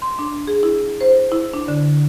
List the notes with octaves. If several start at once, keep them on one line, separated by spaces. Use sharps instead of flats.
C6
D4
G#4
E4
C5
E4
D4
D3